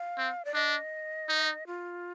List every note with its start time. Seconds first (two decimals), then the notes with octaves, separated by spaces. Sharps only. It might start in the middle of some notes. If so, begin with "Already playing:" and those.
Already playing: F5
0.18 C4
0.45 D5
0.54 D4 D#5
1.29 D#4
1.67 F4